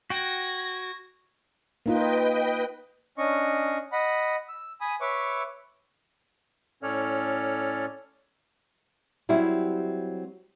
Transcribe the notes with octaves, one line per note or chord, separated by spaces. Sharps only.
F#4 G5 G#6 A#6
A#3 D#4 F4 B4 D#5 G5
C#4 D4 D#5 C#6
D#5 F#5 B5
E6
G#5 B5 D#6
B4 C#5 E5 C#6 D6
A2 C#4 A4 C#5 D5 F6
F#3 G3 C4 E4 G4